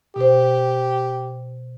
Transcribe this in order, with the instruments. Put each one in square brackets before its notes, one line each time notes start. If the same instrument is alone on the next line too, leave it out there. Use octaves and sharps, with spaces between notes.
[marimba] B2 C5 [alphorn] G4